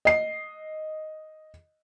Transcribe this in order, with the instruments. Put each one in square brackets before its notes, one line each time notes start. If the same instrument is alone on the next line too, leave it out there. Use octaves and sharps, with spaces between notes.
[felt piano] D#5 C7